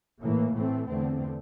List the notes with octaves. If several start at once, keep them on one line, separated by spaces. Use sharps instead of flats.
A2 E3 A#3
A2 E3 A3 C4
E2 D3 A3 C4